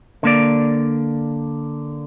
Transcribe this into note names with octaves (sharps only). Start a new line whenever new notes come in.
D3 A#3 D5